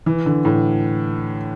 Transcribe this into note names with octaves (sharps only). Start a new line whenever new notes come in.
E3
D3
A2